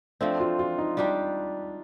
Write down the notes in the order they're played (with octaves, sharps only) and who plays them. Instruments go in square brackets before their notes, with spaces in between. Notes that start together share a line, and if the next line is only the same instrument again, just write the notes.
[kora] F3 A3 C4 [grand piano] D4
[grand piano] F4
F4
D#4
[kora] G3 D4 G4 [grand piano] D#4